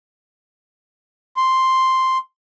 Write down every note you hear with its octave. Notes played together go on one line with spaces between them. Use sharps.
C6